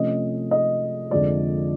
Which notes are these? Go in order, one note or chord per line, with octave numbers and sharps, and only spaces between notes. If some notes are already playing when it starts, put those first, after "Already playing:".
Already playing: C3 F3 A3 C#4 D#5
D#5
F2 D3 F3 G#3 D5